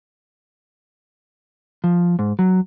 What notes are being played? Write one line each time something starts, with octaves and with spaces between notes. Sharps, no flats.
F3
G#2
F#3